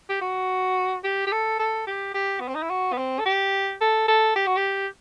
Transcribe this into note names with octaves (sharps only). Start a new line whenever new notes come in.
G4
F#4
G4
G4
A4
A4
G4
G4
B3
C4
D#4
E4
F#4
B3
C4
A4
G4
A4
A4
G4
F#4
G4